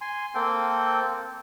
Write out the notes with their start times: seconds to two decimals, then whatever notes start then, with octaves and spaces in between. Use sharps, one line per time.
0.01 G#5 C6
0.35 A#3 C4 A4 G5